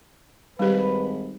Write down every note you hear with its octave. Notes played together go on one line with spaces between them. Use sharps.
G#1 G3 G4 B4